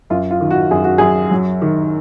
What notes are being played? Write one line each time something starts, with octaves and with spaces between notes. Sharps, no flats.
F#2 F4
F4
D#3
F#4
F#2 G#4
F#4
F#2 G#4
F#3
D#3